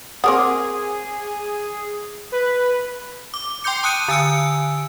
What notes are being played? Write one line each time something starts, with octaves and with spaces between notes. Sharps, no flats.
C4 G#4 A#4 F#5 D6 D#6
B4
D6
G5 C6 D6 G6 C#7
A5 D#6 F#6 C#7 D#7
D3 G#5 E6 D7